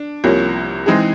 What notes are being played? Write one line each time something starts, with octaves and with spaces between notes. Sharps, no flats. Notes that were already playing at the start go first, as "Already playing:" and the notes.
Already playing: D4
C2 C3 F3 A#3 C#4
E3 G#3 C4 D#4 G#4